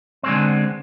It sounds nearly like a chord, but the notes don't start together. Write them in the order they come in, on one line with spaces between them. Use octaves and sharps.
C4 G#3 D3 B3